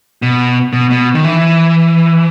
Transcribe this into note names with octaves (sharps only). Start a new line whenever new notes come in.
B2
B2
B2
D#3
E3